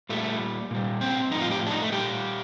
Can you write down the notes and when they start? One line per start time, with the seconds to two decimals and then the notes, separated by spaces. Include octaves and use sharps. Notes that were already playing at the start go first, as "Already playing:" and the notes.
0.09 A#2 G3 A3
0.71 A#2 G3
1.01 C4
1.31 F3 D#4
1.36 A2
1.41 F4
1.51 G4
1.67 D4
1.71 D#4
1.82 A3
1.92 A#2 G3 G4